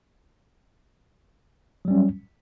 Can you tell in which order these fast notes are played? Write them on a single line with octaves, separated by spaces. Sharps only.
F#3 G3 C#4